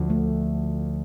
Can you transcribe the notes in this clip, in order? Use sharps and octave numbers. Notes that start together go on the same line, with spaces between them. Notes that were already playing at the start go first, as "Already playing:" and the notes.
Already playing: D2 D3 F3
A3